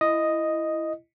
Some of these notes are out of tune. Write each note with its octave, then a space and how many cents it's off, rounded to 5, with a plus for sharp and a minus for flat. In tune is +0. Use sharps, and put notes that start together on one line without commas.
E4 +15 D#5 +0